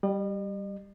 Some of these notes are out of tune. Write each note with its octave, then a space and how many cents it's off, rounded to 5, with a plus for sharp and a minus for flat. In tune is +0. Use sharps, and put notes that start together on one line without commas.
G3 +0 D#5 -45